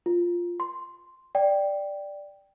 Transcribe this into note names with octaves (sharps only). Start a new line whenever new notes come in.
F4
C6
D5 G5